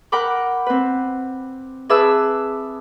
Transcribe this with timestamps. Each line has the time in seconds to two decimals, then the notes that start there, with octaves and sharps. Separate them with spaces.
0.12 A#4 F#5 G5 B5 D6
0.66 C4 B4
1.89 G#4 B4 E5 A5 D6 E6